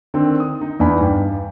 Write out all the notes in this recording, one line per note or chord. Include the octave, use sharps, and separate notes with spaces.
D3 D#3 C4
D#6
D#4
E2 D4 D#4 G#5 B5
G2 G5